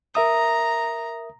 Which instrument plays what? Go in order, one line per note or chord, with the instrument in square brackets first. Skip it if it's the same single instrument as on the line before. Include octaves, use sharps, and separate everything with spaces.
[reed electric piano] A#4 E5 D#6 [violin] A#5